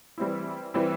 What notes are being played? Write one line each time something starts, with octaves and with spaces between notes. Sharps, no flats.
E3 G3 C4 E4
E3 G3 C4 E4